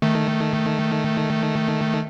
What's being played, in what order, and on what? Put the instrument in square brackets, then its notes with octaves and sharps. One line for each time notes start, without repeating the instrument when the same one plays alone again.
[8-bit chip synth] D#3 A3